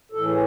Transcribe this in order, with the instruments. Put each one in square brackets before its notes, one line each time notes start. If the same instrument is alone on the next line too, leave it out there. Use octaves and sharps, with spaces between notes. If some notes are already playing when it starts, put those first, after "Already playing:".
[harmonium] A2 E3 A4
G#4